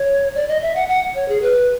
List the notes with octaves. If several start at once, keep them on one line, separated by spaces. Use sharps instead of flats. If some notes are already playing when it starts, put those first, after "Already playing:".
Already playing: C#5
D5
D#5
E5
F#5
F#5
C#5
G#4
B4